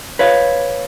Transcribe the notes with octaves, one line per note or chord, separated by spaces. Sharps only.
B4 C#5 F5